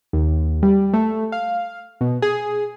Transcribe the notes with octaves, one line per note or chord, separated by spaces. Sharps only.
D#2
G3
A3
F5
B2
G#4